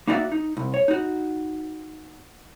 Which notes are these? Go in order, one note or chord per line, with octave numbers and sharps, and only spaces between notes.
A#3 D#4 E4 F#4 D5 E5
D#4
C2
C#5
D#4 F#4